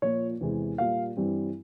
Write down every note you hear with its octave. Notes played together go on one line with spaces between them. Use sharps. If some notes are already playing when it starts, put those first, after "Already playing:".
A#2 F3 A#3 C#5
E2 C3 E3 G#3
A#2 G3 A#3 F5
G2 E3 G3 C4